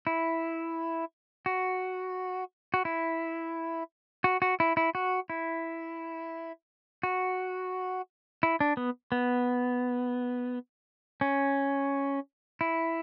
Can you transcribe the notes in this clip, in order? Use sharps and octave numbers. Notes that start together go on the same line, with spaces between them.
E4
F#4
F#4
E4
F#4
F#4
E4
E4
F#4
E4
F#4
E4
D4
B3
B3
C#4
E4